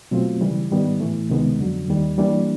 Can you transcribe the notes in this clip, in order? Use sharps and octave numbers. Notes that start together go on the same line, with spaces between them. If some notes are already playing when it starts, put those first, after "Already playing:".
B2 F#3 A3 C4 F4
C#3 E3 G3
G#2 D#3 G3 B3
A2 E3 A3
C#2 C3 D#3 G#3 B3
F2 D3 F#3
D#2 D#3 G3
E3 G3 A#3 D4